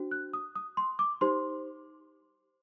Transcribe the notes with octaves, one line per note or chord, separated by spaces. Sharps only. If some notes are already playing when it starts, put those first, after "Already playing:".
Already playing: D4 F#4 C5
F#6
D#6
D#6
C6
D6
D#4 G4 C5 C6